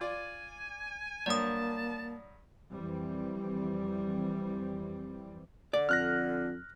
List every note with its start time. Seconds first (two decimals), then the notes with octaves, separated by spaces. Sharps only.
0.01 F4 D5 G#5
1.26 G2 F#3 A#3 D5 A5 D#6
2.70 F2 E3 G3 C4
5.73 D3 D5
5.89 F2 F6 F#6 A#6